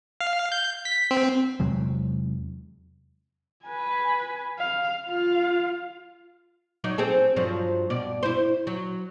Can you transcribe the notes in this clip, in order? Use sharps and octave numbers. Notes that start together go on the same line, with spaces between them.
F5
G6
B6
C4
E2 C3 F#3 G#3
B4 G#5
F5
F4 F5
F#3 D#4 D5
C4 G#4 A4
G2 F3 F#3
G2 B2 D5
E4 C5
F#3